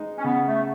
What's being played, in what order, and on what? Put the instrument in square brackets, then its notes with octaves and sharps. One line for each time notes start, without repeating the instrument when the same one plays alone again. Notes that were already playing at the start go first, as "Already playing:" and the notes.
Already playing: [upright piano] G#3 D#4
[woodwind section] C#4
[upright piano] C#3 [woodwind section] B3
[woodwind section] A3